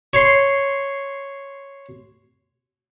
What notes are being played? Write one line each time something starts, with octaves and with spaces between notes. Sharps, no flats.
C#5 C6